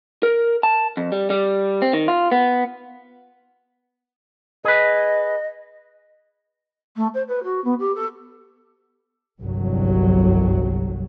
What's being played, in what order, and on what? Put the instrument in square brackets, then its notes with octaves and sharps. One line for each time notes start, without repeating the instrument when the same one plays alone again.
[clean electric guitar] A#4
A5
F2
G3
G3
C4
D#3
F4
B3
[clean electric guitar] G#4 B4 [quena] D#5
[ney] A3
C5
B4
F#4
B3
G4
A4
[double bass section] G1 C2 F2 F#3